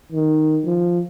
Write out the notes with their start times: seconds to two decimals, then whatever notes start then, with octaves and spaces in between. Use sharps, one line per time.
0.12 D#3
0.65 F3